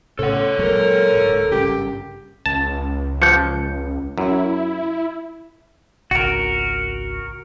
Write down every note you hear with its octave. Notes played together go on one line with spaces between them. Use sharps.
A2 C#3 A4 C#5 F#5
A#2 F#3 G#3 A#4 C#5
D1 G#2
G#1 G2 C#3 G4
C#2 A5
F3 G6 C#7
F#2 E4
G#1 C#2 F#4 A#4